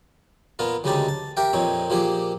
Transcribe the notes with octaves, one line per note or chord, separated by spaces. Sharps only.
A#2 B3 F4 A#4
D2 C#3 G#3 D#4 G4 A5
A5
G4 A#4 E5 G5
F2 A#2 C4 D#4 C#5
A#2 F3 A#3 G4 G#4